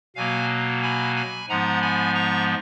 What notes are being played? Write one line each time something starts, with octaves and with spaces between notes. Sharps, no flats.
B2 F#3 A#3 F5 G#5
G#5 B5
G#5 B5
G#2 F3 G#3 B3 F#5 A#5
G#5 B5
A#5 C#6